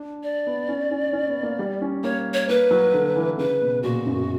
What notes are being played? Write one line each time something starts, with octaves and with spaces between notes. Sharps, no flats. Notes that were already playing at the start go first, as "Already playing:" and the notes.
Already playing: D4
D5
B3
C#4
C#4
C#4
B3
A#3
G3
C#4
A#3 C#5
C#5
A#3 B4
F#3
D3
E3
C#3 B4
B2
A#2 F#4
F#2